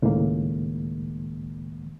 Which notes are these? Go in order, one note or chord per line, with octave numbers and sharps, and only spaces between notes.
C#2 A2 D#3 G#3 A#3